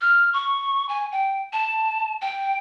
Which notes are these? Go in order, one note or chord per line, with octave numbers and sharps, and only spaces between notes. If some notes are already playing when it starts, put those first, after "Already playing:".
F6
C#6
G#5
G5
A5
G5